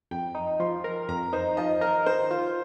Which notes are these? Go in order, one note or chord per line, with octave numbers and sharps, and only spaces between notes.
F2 G5
D#4
F3 C6
A#4
F2 A#5
D#4 C5
F3 D#5
A#4 D#5
D#3 C5
F4